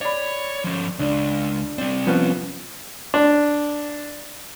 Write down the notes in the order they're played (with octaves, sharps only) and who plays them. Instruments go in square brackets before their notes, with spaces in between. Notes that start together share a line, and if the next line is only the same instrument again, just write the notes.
[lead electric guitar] C#5 [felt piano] D5 B5
[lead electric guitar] F3 C#4
[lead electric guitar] C#2 [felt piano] D4
[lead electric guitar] G3 C4 [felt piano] D5
[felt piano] F3 B3 C#4
[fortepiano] D4